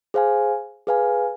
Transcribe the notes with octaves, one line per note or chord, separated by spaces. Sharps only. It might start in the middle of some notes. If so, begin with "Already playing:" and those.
G#4 C5 F5 G#5
G#4 B4 F5 G#5